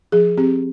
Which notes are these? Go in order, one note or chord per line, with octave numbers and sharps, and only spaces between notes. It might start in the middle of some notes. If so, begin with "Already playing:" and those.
F3 G#4
C4 G4